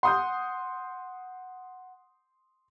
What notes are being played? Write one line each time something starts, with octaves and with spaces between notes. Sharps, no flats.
F#5 C6 D#6 G6